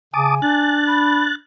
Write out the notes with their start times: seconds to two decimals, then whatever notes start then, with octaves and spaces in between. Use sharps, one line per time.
0.14 C#3 G#5 A5 D6 D#6
0.42 D4 F#6 A6
0.87 B5